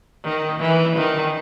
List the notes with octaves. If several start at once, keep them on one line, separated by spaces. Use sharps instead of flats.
D#3
E3
D#3